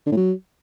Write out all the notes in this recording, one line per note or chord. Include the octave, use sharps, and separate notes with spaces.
D3
A2
F#3